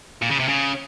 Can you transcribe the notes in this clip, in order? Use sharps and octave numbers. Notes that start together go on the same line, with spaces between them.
A#2
C#3
C3
C#3